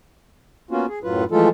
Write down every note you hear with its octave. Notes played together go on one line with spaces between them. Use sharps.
A#3 B3 C#4 F4 F#4
G#4
F#2 A2 F#3 F4 B4
E3 F3 G#3 A3 F4 A4